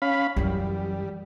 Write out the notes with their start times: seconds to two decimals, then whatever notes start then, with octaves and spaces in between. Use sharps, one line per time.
0.02 C#4 F5 B5
0.36 F#2 E3 G3